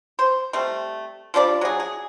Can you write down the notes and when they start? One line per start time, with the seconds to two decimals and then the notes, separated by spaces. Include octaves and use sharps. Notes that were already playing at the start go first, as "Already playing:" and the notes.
0.19 C5
0.53 G3 A3 C4
1.34 F3 G3 D4 D5
1.61 F#3 G#4
1.80 G#4